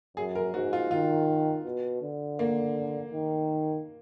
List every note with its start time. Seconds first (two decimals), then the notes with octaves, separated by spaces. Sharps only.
0.17 F#2 G#4
0.35 A#4
0.54 G#2 F#4
0.73 F4
0.91 D#3 F4
1.65 B2
2.02 D3
2.39 A#3
3.13 D#3